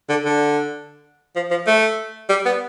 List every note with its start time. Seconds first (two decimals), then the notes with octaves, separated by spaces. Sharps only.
0.09 D3
0.25 D3
1.36 F3
1.50 F3
1.67 A3
2.29 G3
2.46 B3